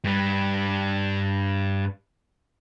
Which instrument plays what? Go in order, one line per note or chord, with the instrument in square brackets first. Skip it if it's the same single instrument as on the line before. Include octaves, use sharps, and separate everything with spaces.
[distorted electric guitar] G2 G3